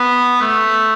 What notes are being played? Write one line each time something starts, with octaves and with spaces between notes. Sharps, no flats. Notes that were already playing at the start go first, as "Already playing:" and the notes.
Already playing: B3
A3